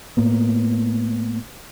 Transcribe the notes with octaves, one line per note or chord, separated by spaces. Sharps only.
A2 A#3 B3